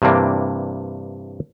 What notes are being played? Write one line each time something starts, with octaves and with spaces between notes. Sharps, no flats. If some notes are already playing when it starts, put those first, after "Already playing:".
G2 C3 E3 A#3 D4